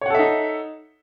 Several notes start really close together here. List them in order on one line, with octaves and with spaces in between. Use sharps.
C#5 F#5 A4 E5 D#4